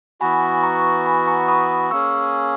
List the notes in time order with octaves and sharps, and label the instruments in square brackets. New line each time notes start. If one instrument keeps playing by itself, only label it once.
[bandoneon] E3 B3 F#4 [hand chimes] G#5 B5
[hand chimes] A#5 C#6
G#5 B5
A#5 C#6
B5 D#6
[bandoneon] A#3 C#4 G#4 [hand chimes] C#6 E6